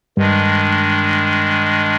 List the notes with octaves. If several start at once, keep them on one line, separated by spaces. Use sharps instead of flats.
G2 D#3 G#3 D4